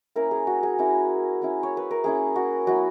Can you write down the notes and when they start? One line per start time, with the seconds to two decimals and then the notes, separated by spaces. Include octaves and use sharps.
0.16 A#3 C#4 E4 A#4
0.31 G#4
0.47 F#4
0.63 G#4
0.79 A#3 C#4 E4
1.41 A#3 C#4 E4
1.63 C#5
1.77 B4
1.91 A#4
2.04 A#3 C#4 E4 G#4
2.36 F#4
2.67 F#3 B3 E4 F#4